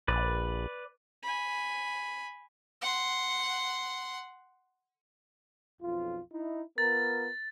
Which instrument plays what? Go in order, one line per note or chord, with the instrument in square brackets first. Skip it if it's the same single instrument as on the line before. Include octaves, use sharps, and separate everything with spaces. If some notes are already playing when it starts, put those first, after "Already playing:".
[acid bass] A#1 [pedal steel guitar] B4 D5
[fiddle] G#5 B5
F#5 C6
[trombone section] B1 F2 F4
D#4 E4
[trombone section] B3 F4 A#4 [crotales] A6